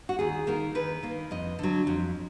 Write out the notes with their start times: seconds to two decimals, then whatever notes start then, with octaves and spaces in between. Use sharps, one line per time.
0.09 F#4
0.19 D#2 G#4
0.47 D#3 A#3 A#4
0.75 D#2 B4
1.03 D#3 A#3
1.31 F2 D#5
1.59 D3 F#3
1.87 F2